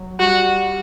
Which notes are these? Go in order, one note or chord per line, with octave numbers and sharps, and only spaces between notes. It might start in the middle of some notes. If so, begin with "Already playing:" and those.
Already playing: F#3
G3 F#4